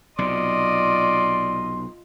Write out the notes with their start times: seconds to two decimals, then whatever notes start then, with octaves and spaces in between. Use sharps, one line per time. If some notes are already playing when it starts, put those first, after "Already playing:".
0.19 B1 C3 F4 D5 D#5 C6